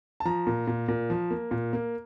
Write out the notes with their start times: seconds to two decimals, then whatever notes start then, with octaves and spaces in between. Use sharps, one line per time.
0.20 A5
0.25 F3 A#5
0.47 A#2
0.67 A#2
0.88 A#2
1.10 F3
1.31 A#3
1.51 A#2
1.73 A#3